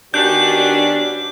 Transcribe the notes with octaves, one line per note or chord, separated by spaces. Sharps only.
D#3 B3 C#4 D4 F#4 G4 G6